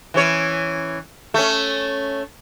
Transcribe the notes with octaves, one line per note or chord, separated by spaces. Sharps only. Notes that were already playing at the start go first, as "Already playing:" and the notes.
E3 C#4 C#5
A3 C#4